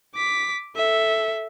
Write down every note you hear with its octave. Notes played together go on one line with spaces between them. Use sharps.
D6 B6
A4 E5